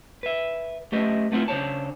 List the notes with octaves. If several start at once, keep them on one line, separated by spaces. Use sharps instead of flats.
B4 E5
A3 C#4 G4 B4 D#5 E5
A3 B3 C4 D4 E4 F4
C#3 D4 E4 C5 C#5 A5